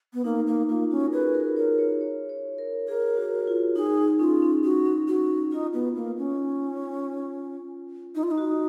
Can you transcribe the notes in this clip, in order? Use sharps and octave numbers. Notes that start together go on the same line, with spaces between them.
B3
A#3 D#4
A#3
A#3 F4
C#4 F#4
A#4
G#4 B4
A#4
A#4 C#5
C#5
C#5
C#5
A#4
G#4 A#4
F#4
F4
D#4 G#4
D#4
C#4 F4
C#4
C#4 F#4
C#4
C#4 F#4
C#4
D#4 F4
B3
A#3
C#4
D#4
F4
D#4
F#4